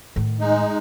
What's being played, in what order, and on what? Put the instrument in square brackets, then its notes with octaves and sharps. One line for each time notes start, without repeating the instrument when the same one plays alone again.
[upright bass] A2 D#3
[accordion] G#3 D#4